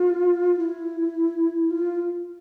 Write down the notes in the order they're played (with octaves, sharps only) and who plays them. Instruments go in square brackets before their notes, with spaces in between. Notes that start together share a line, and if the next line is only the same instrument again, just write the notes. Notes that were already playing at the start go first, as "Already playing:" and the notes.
Already playing: [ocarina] F4
E4
F4